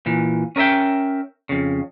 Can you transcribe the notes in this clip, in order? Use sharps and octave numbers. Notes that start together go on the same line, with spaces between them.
A#2 E3
C#4 A#4 D#5 E5 G5
F2 C#3